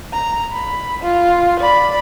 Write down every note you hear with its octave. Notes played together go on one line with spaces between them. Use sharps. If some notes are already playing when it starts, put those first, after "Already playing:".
A#5
B5
F4
D5 B5